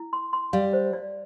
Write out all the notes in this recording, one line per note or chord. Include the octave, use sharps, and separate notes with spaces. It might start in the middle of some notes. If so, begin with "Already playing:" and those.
Already playing: E4
C6
C6
G3 F5
C5
D5